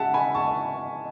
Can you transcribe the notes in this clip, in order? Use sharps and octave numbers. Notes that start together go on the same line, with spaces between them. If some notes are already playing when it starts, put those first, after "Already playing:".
Already playing: C#3 G#3 E5 F#5 A5
G#5 B5
A5 C#6